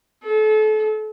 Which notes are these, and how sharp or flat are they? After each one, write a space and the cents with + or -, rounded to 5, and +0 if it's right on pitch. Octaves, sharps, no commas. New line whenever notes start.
A4 -35